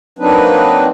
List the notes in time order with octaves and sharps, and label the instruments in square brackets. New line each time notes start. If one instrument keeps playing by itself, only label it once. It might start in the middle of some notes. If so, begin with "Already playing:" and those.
[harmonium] F#3 A#3 C4 D4 D#4 B4